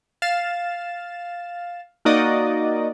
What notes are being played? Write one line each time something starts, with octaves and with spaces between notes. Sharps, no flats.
F5 A6 E7
A#3 D#4 F#4 D5 D#5